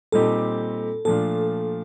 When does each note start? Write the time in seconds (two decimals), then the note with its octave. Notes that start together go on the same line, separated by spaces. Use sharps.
0.12 A#2 G3 C4 D#4 G4 A4
1.05 A#2 F3 A3 D4 F4 A4